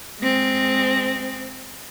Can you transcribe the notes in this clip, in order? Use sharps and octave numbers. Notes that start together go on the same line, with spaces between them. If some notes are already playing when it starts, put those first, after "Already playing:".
G#3 C4